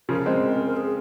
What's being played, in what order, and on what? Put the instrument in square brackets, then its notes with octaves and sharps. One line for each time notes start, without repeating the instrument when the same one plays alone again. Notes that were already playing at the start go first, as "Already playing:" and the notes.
[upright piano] C#3 F3 [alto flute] A#4
[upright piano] G#3 C4
[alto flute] A#4
G#4